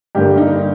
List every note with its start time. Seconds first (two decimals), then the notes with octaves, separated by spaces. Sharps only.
0.15 G2 D3 G3 A#3 G4
0.38 D#4